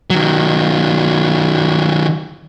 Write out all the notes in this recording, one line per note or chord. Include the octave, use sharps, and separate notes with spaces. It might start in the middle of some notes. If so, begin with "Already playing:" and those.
D#3 F#3